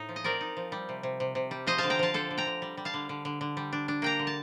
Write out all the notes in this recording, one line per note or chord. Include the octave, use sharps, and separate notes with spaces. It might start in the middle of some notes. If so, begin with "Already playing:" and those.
Already playing: A2 D#4
F3
D#5
C4 A#4 D5
D#4
F3
G3
C3
C3
C3
C3
G3
F3 C5 D#5
D3 F5 A5
G5 A#5
F3 F5 A5
D3 A4 C5
D3
G5 A#5
D3
G3
G3
F5 A5
D3
D3
D3
D3
G3
D4
D4
A#3 G5 A#5
D3
A5